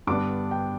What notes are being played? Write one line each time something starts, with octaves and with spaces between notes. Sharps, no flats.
G2 D3 B3 D4 D6
G5